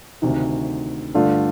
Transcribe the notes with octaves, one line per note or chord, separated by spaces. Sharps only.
D2 C3 D#3
G2 D3 A3 D4 F4